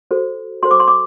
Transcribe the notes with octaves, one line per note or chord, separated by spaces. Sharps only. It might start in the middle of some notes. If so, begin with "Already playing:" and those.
F#4 A4 C5
F#4 A4 C5 C6
D6
C6
D6